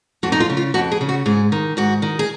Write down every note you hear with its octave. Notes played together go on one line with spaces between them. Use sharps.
F2 F#4
D#4
F4
C#3
F4
F2 F#4
G#4
C#3
F#4
G#2 G#4
D#3
G#2 F#4
D#3
G#4